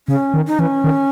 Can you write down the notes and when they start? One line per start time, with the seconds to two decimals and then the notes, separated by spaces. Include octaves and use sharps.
0.08 C#3 C#4
0.34 D#3
0.47 D#4
0.59 E3 C#4
0.84 D#3